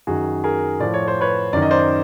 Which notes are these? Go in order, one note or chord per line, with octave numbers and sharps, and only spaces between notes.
F#2 D#3 F#4 G#4
G#4 A#4
A2 F3 D5
C#5
C5
B4 C#5
F#2 D#3 D5
D#5
C5 D5